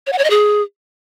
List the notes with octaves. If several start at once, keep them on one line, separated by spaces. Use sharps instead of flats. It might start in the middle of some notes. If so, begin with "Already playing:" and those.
C#5
F#5
C#5
D#5
G#4